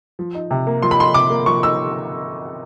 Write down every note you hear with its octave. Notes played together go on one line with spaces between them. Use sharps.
F3
D#4
C3
A#3
F3 C6
B5
D#4 C6
C3 D6
A#3
F3 C#6
D#4 E6